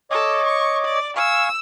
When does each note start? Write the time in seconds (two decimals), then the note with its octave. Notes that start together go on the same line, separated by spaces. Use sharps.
0.11 A4 C#5 D#5 D6
0.46 C#6
0.84 D5
1.17 F5 G#5 C#6 E6